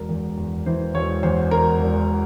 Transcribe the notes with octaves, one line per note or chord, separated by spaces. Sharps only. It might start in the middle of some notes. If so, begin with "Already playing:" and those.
Already playing: E1 A#4
E2
E2
E3 C5
E1 C#5
E2 C5
E1 A#4
E1